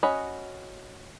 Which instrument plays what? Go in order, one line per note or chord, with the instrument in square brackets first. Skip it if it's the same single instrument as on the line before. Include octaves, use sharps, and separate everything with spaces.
[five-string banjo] C#4 F#4 D#5 B5